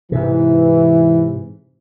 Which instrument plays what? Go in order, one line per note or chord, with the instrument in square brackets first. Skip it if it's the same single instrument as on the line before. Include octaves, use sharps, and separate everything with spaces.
[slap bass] G#2 C3 [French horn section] E3